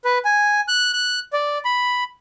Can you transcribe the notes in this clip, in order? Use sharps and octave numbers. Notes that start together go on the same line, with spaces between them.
B4
G#5
F#6
F#6
D5
B5